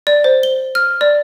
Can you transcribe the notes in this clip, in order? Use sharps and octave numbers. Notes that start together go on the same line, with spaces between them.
D5
C5
G7
F6
D5